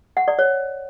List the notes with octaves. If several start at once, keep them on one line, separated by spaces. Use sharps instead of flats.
F#5
D5
C#5